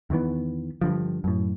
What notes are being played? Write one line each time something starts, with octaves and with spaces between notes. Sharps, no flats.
E2 D#3 E3 B3
G2 D3 F3
F#2 A2